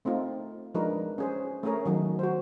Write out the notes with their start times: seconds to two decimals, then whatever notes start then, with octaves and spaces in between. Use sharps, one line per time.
0.05 A3 C4 D#4 F4
0.75 F3 G#3 D4 D#4 A#4 B4
1.18 C#4 G#4 C5
1.63 A3 C#4 G#4 A#4 C#5
1.85 D#3 F#3 D#4
2.19 F#4 C5